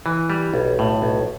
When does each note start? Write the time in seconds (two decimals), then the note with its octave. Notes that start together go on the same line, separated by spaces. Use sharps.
0.06 E3
0.30 G3
0.54 B1
0.79 A2
1.02 B1